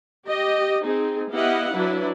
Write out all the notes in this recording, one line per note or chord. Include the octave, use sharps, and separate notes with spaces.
G4 D#5
C4 D#4 G#4
B3 E4 G4 D#5 F5 F#5
F#3 D4 E4 B4